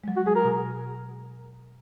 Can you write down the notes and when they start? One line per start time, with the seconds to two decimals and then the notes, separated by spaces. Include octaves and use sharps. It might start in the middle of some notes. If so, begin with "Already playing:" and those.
0.04 G#3
0.08 F#3
0.17 F#4
0.26 G#3 G#4
0.36 A#4
0.44 B2